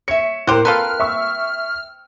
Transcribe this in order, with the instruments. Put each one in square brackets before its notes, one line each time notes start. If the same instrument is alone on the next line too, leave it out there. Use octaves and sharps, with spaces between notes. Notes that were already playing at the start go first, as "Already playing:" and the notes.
[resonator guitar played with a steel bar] C#5 E5 [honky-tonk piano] C#7
[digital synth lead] A2 [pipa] G4 C5 [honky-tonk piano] A#4 C6 F#6
[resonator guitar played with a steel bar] C4 [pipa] F4 A4 B4 [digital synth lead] F6
[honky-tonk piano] E5 C#6 E6